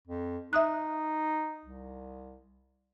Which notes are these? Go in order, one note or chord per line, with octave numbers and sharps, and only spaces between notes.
F2
D#4 E5 D#6 F#6
C2